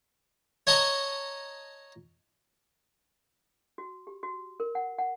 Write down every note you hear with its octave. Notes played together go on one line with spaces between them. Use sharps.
C#5 D#5 A5 A#5 C#6 D#6
F#4
G4
F#4
A#4
F#5
F#5